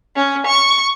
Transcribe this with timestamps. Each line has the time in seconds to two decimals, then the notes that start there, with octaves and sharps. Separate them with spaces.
0.16 C#4
0.47 C#6